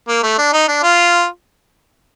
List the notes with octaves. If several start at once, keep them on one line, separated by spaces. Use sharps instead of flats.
A#3
A3
D4
D#4
D4
F4